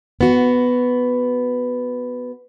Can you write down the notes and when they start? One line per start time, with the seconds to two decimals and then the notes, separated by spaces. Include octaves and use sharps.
0.21 B3 F#4